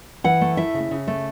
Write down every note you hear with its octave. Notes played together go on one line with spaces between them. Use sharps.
E3 F#5
A3
E4 E5
C#3
C#3
A3